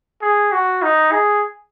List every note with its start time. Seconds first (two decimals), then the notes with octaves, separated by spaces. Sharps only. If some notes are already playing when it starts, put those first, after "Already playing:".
0.22 G#4
0.52 F#4
0.82 D#4
1.12 G#4